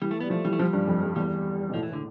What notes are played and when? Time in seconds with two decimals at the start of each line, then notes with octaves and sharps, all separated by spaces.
0.02 E3 G3
0.11 A3
0.20 G3 B3
0.30 F3 A3
0.45 E3 G3
0.53 A3
0.59 F3 G3
0.73 G2
0.87 F2
1.02 F2
1.16 E2 G3
1.70 B2
1.74 A2 F3
1.83 E3
1.90 A2 D3